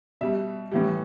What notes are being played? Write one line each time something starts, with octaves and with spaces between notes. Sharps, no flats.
B2 G3 E5
A2 E3 G3